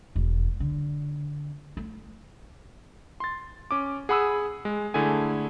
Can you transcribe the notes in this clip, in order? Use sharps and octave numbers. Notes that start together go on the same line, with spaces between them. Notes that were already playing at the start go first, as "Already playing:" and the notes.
E1
D3
A3
C6 A6
C#4 D6
G#4 F#5 B5 D#6 E6
G#3
D3 A3 E4 G#4 G#5